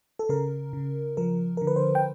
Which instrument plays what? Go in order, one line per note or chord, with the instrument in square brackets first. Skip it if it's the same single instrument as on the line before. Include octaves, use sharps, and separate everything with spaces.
[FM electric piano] A4
C#3 A#4
C#3
F3 A#4
A#4
D3
B4
C5
G5